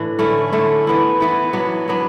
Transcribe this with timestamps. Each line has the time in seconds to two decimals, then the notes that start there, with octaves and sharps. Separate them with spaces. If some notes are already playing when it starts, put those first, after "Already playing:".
Already playing: A2 E3 D4
0.19 D3 A3 C#4 E4
0.52 D3 A3 C#4 E4
0.87 E3 B3 E4
1.20 E3 B3 E4
1.53 F#3 B3 D4
1.88 F#3 B3 D4